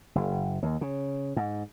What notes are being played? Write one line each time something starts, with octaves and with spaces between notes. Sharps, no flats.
F#1
D#2
C#3
G#2